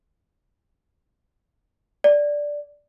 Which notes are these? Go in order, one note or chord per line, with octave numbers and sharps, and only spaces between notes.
D5